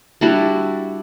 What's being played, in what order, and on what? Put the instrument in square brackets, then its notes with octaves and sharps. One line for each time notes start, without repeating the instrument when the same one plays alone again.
[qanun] G3 D4 E4 F#4